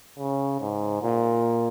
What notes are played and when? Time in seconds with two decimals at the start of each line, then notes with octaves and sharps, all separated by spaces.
0.19 C#3
0.61 G#2
1.03 A#2